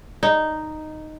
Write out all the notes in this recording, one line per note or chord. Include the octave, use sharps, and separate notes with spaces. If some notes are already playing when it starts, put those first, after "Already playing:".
D#4